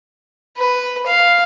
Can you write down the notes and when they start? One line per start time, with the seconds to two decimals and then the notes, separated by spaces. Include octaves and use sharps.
0.57 B4
1.06 F5